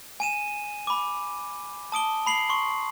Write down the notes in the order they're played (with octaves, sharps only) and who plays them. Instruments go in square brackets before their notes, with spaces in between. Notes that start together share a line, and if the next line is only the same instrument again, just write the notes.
[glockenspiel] G#5 D#7 E7
B5 D6
A5 D#6 D7 G7
B5 C7 F#7
C6 C#6